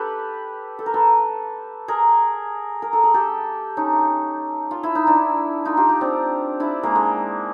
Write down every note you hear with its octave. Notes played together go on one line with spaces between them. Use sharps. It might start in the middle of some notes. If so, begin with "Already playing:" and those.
Already playing: G4 A4 B4
A4
A#4
A4 B4
G#4 A#4
A#4
A4
G#4
G4 A4
C#4 D#4
F4
E4
D#4
D4 E4
D#4 F4
F4 G4
F4 G4
C4 D4
D4 E4
G#3 A#3
G#3 A#3